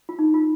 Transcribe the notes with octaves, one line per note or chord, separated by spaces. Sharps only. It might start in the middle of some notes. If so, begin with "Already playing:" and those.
F4
D#4
F4